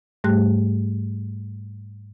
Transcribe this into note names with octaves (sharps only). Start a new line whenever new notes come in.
G#2 G3 A3 G4 F#6